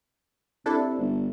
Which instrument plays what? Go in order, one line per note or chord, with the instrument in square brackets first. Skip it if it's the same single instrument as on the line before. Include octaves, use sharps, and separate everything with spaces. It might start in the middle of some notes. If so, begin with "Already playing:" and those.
[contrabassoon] C3 [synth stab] D4 E4 A4
[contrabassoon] G1